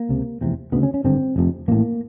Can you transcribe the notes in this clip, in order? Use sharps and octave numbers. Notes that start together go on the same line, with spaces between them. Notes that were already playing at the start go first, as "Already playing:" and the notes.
Already playing: A#3
C#2 C3
F1 E2 C3
D2 C#3 B3
C#4
C#4
G#1 G2 D3 C4
F1 F2 C3
A1 A2 A#3